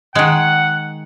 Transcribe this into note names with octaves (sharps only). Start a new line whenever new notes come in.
D#3 G#3 F#5